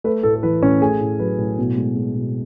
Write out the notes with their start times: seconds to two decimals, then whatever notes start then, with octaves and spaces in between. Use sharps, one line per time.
0.04 A3 B4
0.23 A2 A4
0.35 A4
0.43 E3 B4
0.62 A2 C#4 C#5
0.81 A3 G#4 G#5
1.00 A2
1.19 F#3 B4
1.38 A2
1.58 B2
1.77 G#3
1.96 G#3
2.15 B2